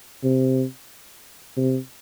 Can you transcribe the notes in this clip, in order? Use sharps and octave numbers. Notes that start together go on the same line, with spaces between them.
C3
C3